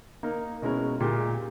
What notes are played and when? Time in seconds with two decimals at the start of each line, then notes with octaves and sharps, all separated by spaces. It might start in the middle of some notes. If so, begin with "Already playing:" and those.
0.23 A#3 D#4 A#4
0.62 B2 G#3 C#4 E4 A#4
1.00 A#2 G#3 D#4 G4